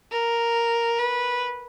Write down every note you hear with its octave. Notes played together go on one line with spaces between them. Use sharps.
A#4
B4